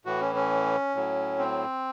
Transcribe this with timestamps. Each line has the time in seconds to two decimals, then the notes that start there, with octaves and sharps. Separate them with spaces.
0.05 A2 E3 F#4
0.21 C#4
0.36 C#4
0.95 A2 F#3
1.39 C4